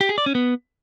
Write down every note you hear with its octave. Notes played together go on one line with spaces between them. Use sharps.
G4
G#4
D5
C#4
B3